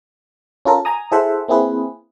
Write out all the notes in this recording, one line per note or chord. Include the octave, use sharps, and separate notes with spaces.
C#4 F4 A4 A#4
G#5 A#5 D#6
E4 G#4 A4 C5 E5 F#5
A#3 C4 E4 G#4 B4